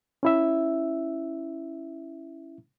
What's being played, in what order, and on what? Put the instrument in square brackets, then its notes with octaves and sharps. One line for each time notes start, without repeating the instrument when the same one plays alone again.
[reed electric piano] C#4 E4 E5